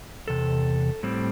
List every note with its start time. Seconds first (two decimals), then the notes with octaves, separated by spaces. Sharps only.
0.28 E2 C3 A4
1.03 A2 G3 C4